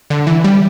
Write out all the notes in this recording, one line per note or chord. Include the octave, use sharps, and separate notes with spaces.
D3
E3
G3